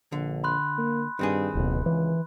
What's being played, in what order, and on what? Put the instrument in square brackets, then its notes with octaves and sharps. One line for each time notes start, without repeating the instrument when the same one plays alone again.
[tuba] A#1 [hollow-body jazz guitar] D3
[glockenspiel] B5 C6 F#6
[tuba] A#3
[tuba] G2 [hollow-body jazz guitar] D#3 C4 G#4
[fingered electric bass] D1 B2 [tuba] A1
[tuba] C#2 [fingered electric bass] E3